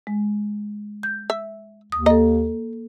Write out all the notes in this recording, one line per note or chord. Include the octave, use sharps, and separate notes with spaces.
G#3
G6
E5
D#2 D#6
A#3 A4 D#5